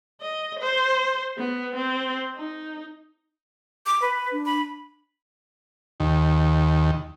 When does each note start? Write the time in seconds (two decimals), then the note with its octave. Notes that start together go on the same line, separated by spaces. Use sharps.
0.21 D#5
0.59 C5
1.37 B3
1.76 C4
2.36 D#4
3.86 D6
4.02 B4
4.32 D4
4.46 B5
6.00 D#2